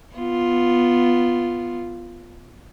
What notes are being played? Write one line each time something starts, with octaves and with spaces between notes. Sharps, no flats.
B3 F4